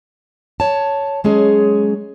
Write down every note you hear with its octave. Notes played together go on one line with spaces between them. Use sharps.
C#5 A5
F#3 G#3 C#4 G#4